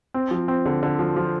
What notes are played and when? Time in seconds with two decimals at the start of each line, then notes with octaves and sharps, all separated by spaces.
0.14 C4
0.31 F3
0.48 C4
0.66 D3
0.83 D3
0.99 F3
1.16 F3